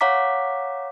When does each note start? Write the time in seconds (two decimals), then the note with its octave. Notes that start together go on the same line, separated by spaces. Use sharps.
0.01 C#5 F5 F#5 A#5 D6 B6